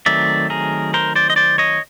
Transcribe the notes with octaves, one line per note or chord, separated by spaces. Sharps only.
D#3 F#3 A3 C4 D5 E5
G#4 A#4
A#4 C5
C5 D5
D#5
C5 D5
C#5 D#5